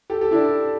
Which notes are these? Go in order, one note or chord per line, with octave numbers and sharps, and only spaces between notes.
G4 A4
G4 A4
D4 E4